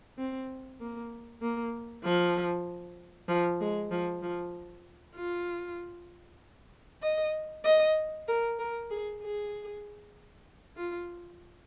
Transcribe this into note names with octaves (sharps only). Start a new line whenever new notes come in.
C4
A#3
A#3
F3
F3
G#3
F3
F3
F4
D#5
D#5
A#4
A#4
G#4
G#4
F4